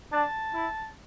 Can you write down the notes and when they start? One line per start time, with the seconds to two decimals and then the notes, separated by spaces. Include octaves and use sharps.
0.12 D4 A5
0.54 E4